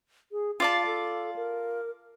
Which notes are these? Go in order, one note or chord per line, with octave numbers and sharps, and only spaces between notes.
G#4
F4 D5 F5 A5
A4
A#4